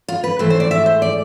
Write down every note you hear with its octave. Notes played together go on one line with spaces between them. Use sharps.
F4
B4
G#2 E3 A3 C5
C5
D5
E5
C5
D5